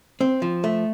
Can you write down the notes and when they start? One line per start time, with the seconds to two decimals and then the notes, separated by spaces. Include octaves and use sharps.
0.21 C4
0.42 F3
0.64 A3